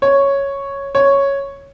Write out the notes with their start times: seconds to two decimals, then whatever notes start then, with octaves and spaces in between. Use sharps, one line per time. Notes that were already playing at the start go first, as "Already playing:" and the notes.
0.02 C#5
0.95 C#5